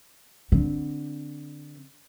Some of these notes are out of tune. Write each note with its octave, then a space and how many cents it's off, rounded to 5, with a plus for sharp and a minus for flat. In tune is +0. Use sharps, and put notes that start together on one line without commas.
D3 +5 C4 +0